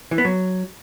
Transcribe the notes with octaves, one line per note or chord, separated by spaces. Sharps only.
E3
B3
F#3